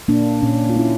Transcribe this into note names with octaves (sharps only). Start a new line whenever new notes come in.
A#2 A#3 D4
A#2 C#4
F4
A#3 C#4 E4